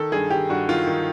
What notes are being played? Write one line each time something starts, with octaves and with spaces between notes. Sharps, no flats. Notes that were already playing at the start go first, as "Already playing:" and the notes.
Already playing: D#3 A4
G2 G#4
D#3 G4
G2 F#4
D#3 F4
D#3